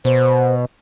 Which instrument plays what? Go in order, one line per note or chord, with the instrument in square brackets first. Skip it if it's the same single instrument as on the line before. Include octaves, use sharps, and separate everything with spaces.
[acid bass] B2 [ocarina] C5